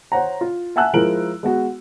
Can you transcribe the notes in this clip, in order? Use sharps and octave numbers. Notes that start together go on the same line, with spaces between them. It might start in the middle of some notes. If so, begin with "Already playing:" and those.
C5 C#5 F#5 A#5
F4
E5 F#5 G#5 A5 E6 F#6
F3 G#3 E4 A#4 D7 F#7
G#3 B3 F#4